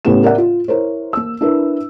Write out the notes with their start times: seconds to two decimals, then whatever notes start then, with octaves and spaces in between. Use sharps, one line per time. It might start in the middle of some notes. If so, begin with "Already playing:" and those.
0.05 A2 C#3 B3 E4 G4 E7
0.24 A#4 D5 E5 F#5
0.38 F4
0.68 E4 A#4 C5 C#5
1.13 A#3 E6
1.41 D4 E4 A#4 B4